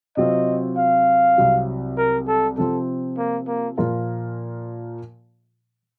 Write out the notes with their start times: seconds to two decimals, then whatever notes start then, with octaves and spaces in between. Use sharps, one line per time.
0.17 C3 F#3 C4 F4 D#5
0.78 F5
1.38 C2 C3 F#3
1.97 A#4
2.27 A4
2.57 C3 F3 C4 A4
3.18 A#3
3.47 A#3
3.77 A#2 F3 A#3 F4 A#4